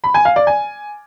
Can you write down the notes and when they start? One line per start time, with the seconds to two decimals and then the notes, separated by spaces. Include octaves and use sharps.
0.04 B5
0.14 G#5
0.25 F5
0.36 D5
0.47 G#5